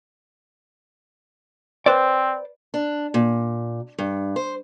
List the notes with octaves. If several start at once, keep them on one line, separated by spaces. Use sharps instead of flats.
C4 B4 C5 D5
D4
A#2
G2
C5